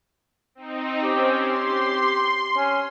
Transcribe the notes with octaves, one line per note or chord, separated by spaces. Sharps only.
C4 D#4
C4 C#4 G4
C6
C#4